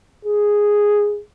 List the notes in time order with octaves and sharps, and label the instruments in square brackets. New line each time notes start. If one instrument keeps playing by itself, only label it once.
[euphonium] G#4